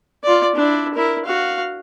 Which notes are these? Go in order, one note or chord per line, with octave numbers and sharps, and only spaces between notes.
F4 D5
D4 E4
E4 A#4
F#4 F5